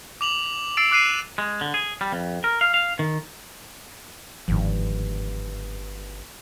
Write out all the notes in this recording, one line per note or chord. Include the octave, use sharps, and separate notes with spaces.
D6 F7 F#7
D6 E6 A6 C7 D7 E7
D6 F#6 C7 D#7 E7
G#3
D3
G#4
G3
F2
A#4
F5
F5
D#3
G1 G#2 D#3 F3